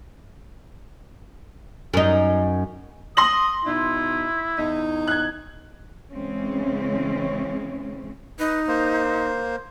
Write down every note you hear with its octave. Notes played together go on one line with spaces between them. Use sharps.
F#2 D#4
C6 D#6 A#6 F#7
B2 D#4 E4
E2 D#4
F#6 G#6
C#3 E3 G#3 C4 C#4
D#4 B4
A#3 C5